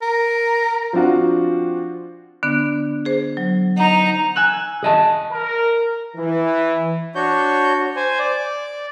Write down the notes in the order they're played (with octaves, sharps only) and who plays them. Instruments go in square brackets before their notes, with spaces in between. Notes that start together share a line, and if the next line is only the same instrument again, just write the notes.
[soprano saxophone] A#4
[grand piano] F3 C4 D4 F4 F#4
[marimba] D3 B3 D4
G#4 C5
F#3
[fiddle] D#4 A#5 [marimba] F#5
[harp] G#5 E6 F#6
[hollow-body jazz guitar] G#4 D#5 A5
[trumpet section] A#4
[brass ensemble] E3
[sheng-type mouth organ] D4 F#4 C#5 G6
C5 G#5
D5